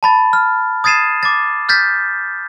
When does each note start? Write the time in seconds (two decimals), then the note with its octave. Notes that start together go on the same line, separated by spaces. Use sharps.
0.03 A5 B5 A6
0.33 F6
0.84 D#6 G#6 A6 C7 D#7 E7
1.23 D6 A6
1.69 F6 G6 A6 B6